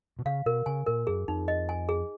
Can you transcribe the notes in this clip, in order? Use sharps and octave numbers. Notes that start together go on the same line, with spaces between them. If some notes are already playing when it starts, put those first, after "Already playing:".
B2
C#3 F5
B2 A#4
C#3 G#5
A#2 A#4
F#2 G#4
F2 D#4
D#5
G#5
G#4